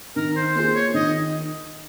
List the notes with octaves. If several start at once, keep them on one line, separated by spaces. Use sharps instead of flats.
D#3 A#4
C5
A#3 F4 G#4 C5
C#5
D#3 D#5